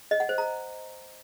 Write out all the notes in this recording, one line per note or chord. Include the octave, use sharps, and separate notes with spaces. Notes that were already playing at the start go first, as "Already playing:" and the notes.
D#5
F#5
C5
A#5